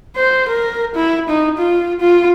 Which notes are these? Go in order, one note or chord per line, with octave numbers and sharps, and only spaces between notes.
C5
A#4
E4
D#4
F4
F4